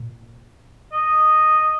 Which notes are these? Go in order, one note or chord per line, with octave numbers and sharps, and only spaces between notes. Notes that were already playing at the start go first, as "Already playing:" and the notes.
Already playing: A#2
D#5